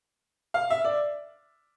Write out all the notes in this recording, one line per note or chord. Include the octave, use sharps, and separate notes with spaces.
F5
E5
D5